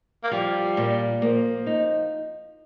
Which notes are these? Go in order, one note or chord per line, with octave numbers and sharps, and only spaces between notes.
A#3
F3 G3
A#2
F3 A#3
D#4